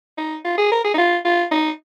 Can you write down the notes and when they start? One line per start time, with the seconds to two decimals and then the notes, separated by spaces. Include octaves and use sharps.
0.18 D#4
0.45 F4
0.58 G#4
0.72 A#4
0.85 G#4
0.94 D#4
0.98 F4
1.25 F4
1.51 D#4